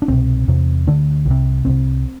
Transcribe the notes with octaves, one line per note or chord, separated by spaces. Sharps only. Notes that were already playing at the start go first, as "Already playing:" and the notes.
D4
C2 B2 C4
E2 C3
D2 D3 D4
C2 C3
C2 C3 C4